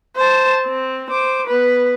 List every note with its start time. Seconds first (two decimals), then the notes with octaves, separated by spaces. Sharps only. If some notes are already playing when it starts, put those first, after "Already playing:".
0.17 C5 A5
0.66 C4
1.10 C5 D6
1.47 B3 B4